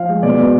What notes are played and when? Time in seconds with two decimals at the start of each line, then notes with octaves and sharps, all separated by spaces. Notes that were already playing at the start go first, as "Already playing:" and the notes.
Already playing: F3 F5
0.09 G#3
0.23 B2 D5
0.38 B2